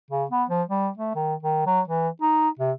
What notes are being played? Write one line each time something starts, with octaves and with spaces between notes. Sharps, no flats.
C#3
B3
F3
G3
A3
D#3
D#3
F#3
E3
D#4
C3